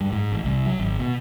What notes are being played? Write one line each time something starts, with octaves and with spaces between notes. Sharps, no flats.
G2
G#2
A1
C2
F#3
G#1
B2